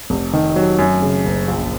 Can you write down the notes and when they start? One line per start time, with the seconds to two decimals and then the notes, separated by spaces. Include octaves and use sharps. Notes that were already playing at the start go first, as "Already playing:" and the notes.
0.10 F1
0.33 D#3
0.56 F#3
0.79 F#2
1.02 C#3
1.25 F#1
1.48 A#1